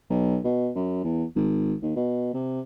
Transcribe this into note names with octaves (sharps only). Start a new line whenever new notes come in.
B1
B2
F#2
E2
G#1
D#2
B2
C3